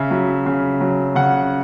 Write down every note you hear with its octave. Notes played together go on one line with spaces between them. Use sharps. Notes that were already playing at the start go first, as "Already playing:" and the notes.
Already playing: C#3 E5
F#3
C#3
F#3
C#3 F#5